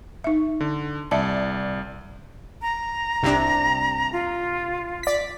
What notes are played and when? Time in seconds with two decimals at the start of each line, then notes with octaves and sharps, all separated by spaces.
0.24 D#4 E5
0.60 D3
1.11 C2 D5 E5 A5
2.62 A#5
3.23 C2 C3 D4
4.13 F4
5.03 D5 B6